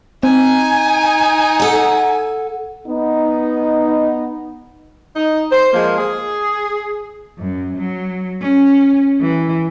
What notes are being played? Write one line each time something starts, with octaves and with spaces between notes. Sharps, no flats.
C4 D#4 G#5
A4 F#5
B3 D#4
D#4
C5
F3 G#3 A#3
G#4
F#2
F#3
C#4
E3